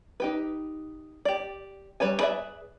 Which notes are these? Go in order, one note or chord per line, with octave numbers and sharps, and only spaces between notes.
D#4 G4 B4
G4 D5
G3 B4 C#5 G#5
G#4 B4 D5 E5